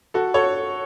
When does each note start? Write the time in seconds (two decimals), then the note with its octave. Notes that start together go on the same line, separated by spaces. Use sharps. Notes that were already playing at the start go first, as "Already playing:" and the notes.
0.14 F#4 A4
0.34 A4 C#5